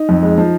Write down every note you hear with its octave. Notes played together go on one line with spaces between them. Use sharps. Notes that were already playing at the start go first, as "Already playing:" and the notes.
Already playing: D#4
F2
G#3
F3